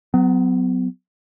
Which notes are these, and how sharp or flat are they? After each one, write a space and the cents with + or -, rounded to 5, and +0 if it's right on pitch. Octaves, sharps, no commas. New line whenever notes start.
F#3 +0 B3 +35